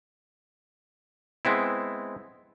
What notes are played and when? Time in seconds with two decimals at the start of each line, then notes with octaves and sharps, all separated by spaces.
1.45 G#3 B3 C4 E4